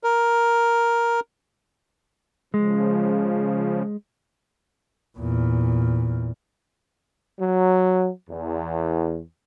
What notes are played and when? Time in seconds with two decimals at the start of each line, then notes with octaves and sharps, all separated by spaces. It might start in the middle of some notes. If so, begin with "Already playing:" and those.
0.04 A#4
2.54 C#3 F3 G#3
5.17 E2 A#2
7.40 F#3
8.29 E2